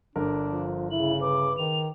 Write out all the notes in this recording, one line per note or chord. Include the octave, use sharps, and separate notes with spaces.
G1 D3 D4 A#4
F3
C#3 E4 F#7
B4 D6
D#3 F7